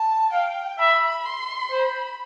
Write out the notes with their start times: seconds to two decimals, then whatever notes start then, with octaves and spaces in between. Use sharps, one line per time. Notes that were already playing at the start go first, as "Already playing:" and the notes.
Already playing: A5
0.32 F5 G5
0.79 E5 B5
1.25 C6
1.72 C5 B5